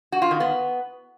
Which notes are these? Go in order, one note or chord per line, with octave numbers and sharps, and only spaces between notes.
F#4
F4
D#3
B3